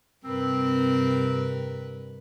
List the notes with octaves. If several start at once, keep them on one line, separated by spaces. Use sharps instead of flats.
G2 C3 C4 A#4 B4